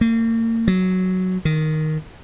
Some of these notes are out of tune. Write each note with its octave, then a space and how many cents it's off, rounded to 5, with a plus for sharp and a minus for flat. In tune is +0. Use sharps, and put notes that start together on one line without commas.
A#3 -40
F#3 +0
D#3 +0